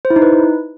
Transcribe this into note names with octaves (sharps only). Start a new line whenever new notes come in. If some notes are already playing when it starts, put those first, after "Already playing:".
C5
E4
D#4
B4